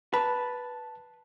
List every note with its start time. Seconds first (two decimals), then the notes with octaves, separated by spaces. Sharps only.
0.14 B4 A5